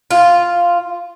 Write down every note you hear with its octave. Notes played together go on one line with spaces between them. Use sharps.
F4